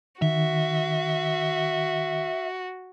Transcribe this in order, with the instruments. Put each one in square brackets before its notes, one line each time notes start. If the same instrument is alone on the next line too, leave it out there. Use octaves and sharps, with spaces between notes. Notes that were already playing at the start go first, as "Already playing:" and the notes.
[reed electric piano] D#3 [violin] F#4 [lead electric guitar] E5